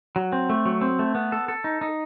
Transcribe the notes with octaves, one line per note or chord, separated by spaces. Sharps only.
F#3
C4
A3
F#3
C4
A3
B3
A4
A4
D#4
D#4